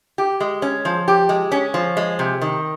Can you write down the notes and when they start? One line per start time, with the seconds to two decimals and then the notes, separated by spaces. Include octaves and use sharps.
0.18 G4
0.40 G#3
0.62 C#4
0.85 F3
1.08 G4
1.29 G#3
1.52 C#4
1.74 F3
1.97 G#3
2.19 C3
2.42 D#3